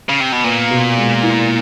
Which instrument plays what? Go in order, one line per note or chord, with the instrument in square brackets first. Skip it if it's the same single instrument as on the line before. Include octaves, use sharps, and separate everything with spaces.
[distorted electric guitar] C#3
C3
B2
[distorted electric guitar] A#2 [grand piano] B3
[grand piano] B2
G#3
E4